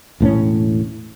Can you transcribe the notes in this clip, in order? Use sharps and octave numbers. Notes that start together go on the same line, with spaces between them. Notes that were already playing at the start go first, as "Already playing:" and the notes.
E1 A2 C4 C#4